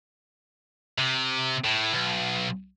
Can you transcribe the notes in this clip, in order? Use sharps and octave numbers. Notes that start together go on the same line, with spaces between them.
C3
A2
B1